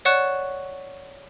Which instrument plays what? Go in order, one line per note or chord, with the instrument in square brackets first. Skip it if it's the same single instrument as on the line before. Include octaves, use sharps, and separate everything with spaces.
[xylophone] C#5 D5 F#5 C#6 F#6 E7